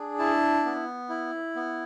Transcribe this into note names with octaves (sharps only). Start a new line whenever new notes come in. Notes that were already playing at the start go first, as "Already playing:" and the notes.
Already playing: D4 G#4
E4 A5
B3
E4
B3